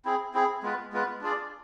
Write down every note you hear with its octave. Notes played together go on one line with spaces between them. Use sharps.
C4 E4 G#4
C4 E4 G#4
G#3 B3 F4 B4
G#3 B3 F4 B4
D4 F4 G#4 D5